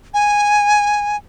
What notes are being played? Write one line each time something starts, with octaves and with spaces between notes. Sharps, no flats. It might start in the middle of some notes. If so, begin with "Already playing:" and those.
G#5